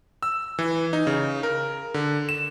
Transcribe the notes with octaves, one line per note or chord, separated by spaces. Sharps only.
E6
E3
D#4
C#3
A#4
D3
E7